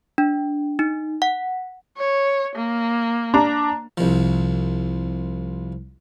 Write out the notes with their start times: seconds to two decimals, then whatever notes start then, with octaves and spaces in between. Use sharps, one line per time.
0.18 D4
0.79 D#4
1.22 F#5
1.97 C#5
2.56 A#3
3.34 D4 A#5
3.98 C2 F3